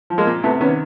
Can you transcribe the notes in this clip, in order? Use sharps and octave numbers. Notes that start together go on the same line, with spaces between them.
F3
G#3 A#3
A#2
C3 A3 B3
D#3 B3 C#4